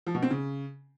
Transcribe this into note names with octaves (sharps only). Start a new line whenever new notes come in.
F3
B2
C4
C#3